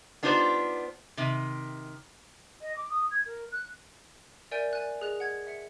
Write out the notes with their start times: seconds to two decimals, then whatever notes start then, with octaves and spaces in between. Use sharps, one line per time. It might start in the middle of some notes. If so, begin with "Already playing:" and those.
0.23 B3 D4 D#4 F4 G4 C5
1.17 C3 D#3
2.61 D#5
2.76 D6
2.90 D#6
3.11 G#6
3.26 A#4
3.52 F#6
4.51 A#4 D5 E5 G#5 G6 D7
4.73 D5 G#5 F#6
5.01 G#4 D#5 F#6 F7
5.20 F#5 G#6
5.47 E5 C#7